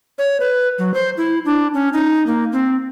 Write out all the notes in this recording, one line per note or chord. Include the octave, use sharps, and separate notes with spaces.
C#5
B4
F#3
C5
E4
D4
C#4
D#4
A#3
C4